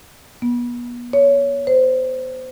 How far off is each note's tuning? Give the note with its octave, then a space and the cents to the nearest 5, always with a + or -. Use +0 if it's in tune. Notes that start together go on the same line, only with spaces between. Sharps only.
B3 -35
C#5 +15
C5 -25